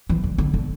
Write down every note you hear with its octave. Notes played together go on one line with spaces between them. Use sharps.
E3
D3
D3
D3